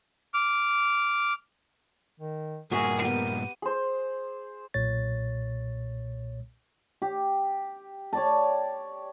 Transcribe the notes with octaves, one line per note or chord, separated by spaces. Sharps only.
D6 F6
D#3
G2 A#2 F#4 G#4 A#4 E5
B3 G4 D#7
G#4 C5
B1 A#2 C#5 A6
G4
C#5 D5 A5